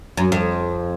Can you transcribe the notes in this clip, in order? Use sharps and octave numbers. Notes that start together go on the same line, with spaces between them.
F#2
F2